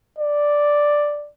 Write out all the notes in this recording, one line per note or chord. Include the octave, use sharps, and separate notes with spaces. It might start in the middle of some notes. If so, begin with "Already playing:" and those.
D5